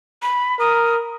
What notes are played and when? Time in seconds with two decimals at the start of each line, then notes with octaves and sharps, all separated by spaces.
0.22 B5
0.60 A#4 D#6